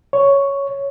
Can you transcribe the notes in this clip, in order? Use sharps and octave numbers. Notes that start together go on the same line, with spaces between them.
C#5